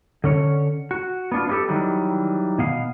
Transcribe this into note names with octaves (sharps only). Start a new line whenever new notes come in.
D3 C#4 C#5
F#4
B3 D4 F4
B3 C#4 F4 G4 A4
D#3 E3 F#3 G3
B2 B3 F5